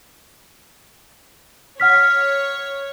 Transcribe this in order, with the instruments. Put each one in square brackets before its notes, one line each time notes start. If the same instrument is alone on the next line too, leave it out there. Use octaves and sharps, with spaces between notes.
[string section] C#5 [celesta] F#5 F6 B6